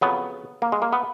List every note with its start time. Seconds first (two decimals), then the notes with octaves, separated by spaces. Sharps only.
0.01 F2 C#3 F#3 B3
0.62 A#3
0.72 G#3
0.82 A#3
0.93 B3